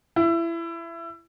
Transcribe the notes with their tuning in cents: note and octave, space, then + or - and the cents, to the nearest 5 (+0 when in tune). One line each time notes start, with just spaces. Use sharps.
E4 +25